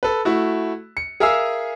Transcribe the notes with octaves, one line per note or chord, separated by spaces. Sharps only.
A4 B4
A3 E4 F#4
C#7
G#4 A#4 E5 F5 G#5 E6